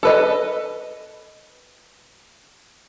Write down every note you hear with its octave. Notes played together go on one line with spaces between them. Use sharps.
A4 B4 D#5